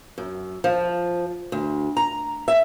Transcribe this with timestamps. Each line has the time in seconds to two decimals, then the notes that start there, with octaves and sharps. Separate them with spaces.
0.18 F#2
0.64 F3
1.52 D2
1.97 A#5
2.48 E5